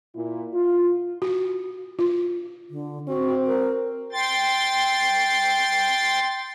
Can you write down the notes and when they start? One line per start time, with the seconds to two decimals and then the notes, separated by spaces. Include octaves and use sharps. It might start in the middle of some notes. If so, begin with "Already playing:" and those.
0.15 A#2 E4
0.54 F4
1.22 F#4
1.99 F4
2.70 D3
3.08 C4 F#4
3.47 A#4
4.12 G5 C6 A6